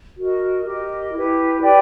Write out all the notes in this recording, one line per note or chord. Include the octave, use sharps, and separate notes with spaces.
F#4 A#4 D#5
G4 A#4 D#5
E4 G4 B4
G4 B4 D5 G5